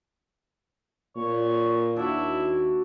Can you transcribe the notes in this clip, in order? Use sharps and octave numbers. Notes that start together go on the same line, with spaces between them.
A#2 C#5
D#2 D4 E4 F#4